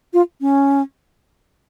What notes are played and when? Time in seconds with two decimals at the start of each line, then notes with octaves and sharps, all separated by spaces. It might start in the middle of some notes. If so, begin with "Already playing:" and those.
0.13 F4
0.41 C#4